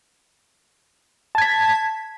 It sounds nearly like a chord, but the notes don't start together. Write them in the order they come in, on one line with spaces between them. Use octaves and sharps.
A5 G#6 B6